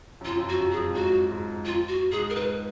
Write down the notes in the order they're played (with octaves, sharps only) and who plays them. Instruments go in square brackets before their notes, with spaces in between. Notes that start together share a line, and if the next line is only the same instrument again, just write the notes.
[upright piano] F#2
[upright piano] F2 [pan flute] F4
[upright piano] F#2
F2
[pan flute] F#4
[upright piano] F#2
[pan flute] G#4
[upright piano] F2
G#2
[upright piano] F#2 [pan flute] F#4
[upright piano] G#2
[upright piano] F2 [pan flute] F4
[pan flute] F#4
[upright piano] G#2 [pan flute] G#4
[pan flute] A#4
[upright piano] G#2 [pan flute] B4